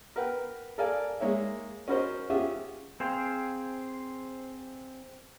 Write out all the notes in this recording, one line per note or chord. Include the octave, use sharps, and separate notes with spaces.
A#4 B4 F#5 G5
A4 A#4 D5 F5 G#5
G#3 A#3 C#5 E5
C#4 F#4 A#4 C5 D#5
C#4 F4 G4 G#4 E5 F#5
C4 G#4 C5 F5 G5